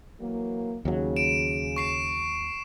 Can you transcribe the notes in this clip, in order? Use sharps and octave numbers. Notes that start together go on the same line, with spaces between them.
E3 F#3 A#3
D#2 C#3 F#3
D7 E7
C#6 C7 E7